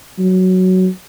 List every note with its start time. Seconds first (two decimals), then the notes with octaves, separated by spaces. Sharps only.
0.19 F#3